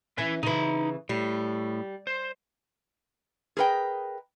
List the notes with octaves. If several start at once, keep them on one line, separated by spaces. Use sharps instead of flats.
E3 C#4 B4 G#5
C#3 E3 D#4 B5
A2 G3
C5
G#4 A#4 B4 D#5 G5